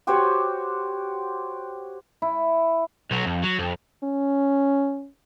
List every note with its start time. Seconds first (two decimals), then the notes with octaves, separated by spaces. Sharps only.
0.07 F#4 G4 C5 C#5
2.22 E4
3.11 B1 F#3
3.26 F2
3.43 F#3
3.59 F2
4.04 C#4